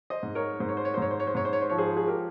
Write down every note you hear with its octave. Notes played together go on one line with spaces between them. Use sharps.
C5 D#5
G#2
A#4 C#5
G#2 C5
C#5
C5
C#5
C5
G#2 C#5
C5
C#5
C5
G#2 C#5
C5
C#5
C5
F3 C#5
G#4 C5
G#4
G4 A#4